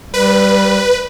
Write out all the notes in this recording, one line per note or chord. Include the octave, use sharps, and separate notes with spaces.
G3 B4